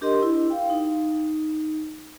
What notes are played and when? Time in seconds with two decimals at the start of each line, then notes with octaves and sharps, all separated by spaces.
0.01 D4 G4 A#4 D#5 C6
0.23 E4
0.50 F5 G5
0.70 D#4